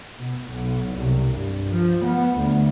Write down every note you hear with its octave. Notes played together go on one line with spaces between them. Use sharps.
B2
B1
C2
G2
F3
B3
D2